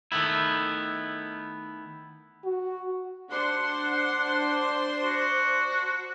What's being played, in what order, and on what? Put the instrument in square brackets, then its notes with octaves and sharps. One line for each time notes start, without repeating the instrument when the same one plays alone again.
[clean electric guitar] D#3 A3 B3 E4
[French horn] F#4
[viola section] D4 C5 C6 [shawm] F#5
[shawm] F#4